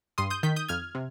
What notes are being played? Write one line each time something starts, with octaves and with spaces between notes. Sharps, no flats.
G2 C6 D#6
D#6 G6
D#3 G6 B6
D#6 G6
F2 F6 G#6
C3